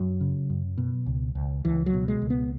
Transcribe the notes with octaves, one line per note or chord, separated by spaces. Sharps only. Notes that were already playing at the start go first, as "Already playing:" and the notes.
Already playing: F#2 F#3
C#3
F#2
B2
C#2
C#2
C#2 E3
F#3
B2
G#3
C#2
B3